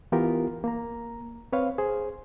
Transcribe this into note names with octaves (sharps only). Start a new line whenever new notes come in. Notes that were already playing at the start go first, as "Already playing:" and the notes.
E3 B3 F4 G4 A#4
A#3 A#5
C4 B4 C#5 F5
G#4 C5